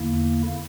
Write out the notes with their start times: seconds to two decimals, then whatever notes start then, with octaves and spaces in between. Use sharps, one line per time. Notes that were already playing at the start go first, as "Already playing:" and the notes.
Already playing: E2 D3 A#3 E4